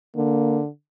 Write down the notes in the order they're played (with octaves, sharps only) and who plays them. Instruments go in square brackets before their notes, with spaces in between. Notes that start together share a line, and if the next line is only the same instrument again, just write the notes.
[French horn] D3 [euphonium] A#3